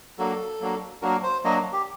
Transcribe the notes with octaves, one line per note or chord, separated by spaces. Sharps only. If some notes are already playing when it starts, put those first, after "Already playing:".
F#3 A#3 D4 F#4 A4
F#3 A#3 D4 F#4
F#3 A#3 D4 F#4 A#4
C5
F#3 A#3 D4 F#4 D#5
G4